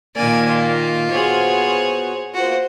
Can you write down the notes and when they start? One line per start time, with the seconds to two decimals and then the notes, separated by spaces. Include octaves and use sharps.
0.16 A#2 D#3 A#3 D5 G#5
0.48 F4
1.11 B3 F#4 G#4 C5 C#5
2.34 A#3 B3 F4 F#4 C5